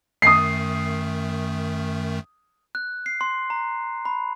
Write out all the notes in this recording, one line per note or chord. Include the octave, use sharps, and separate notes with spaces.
F#2 D#3 A3 D#6 C7
F#6
C7
C6
A#5
B5